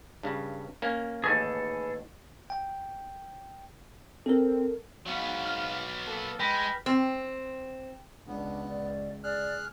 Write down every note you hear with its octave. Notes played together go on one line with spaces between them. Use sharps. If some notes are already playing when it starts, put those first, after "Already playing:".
G2 C#3
A#3 C#4
A1 D#2 G#4 A4 B4
G5
C4 A4 A#4
G#2 F#3 B3 F5
F6
A#3 A4
G#3 G#4 B4 G5 B5 A#6 B6
C4
C#2 B3 D4
D5
G#4 D5 F6 F#6